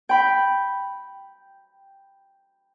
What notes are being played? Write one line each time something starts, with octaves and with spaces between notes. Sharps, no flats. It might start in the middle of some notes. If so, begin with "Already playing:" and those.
G5 B5